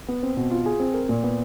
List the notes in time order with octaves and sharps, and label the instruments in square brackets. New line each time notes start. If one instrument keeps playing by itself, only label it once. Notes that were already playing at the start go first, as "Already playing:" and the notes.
[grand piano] B3
C4
B2
F4
G#4
C4
A#4
A#2
B3